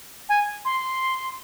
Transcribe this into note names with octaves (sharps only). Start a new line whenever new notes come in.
G#5
C6